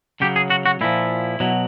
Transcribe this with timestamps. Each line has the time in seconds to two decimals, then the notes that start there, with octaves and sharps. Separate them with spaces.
0.21 C#3 F#3 G4
0.36 G#4
0.50 F#4
0.66 F#4
0.81 A#2 F3 E4
1.40 B2 F#3